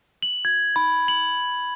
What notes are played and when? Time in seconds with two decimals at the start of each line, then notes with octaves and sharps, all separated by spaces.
0.23 F#7
0.45 G#6
0.76 B5
1.08 F#7